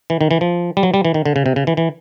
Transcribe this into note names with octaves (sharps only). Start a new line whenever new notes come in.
E3
D#3
E3
F3
G3
F#3
G3
E3
D#3
D3
C#3
C3
C#3
E3
E3